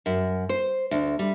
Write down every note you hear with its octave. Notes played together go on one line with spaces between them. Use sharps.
F#2
C5
D2
G3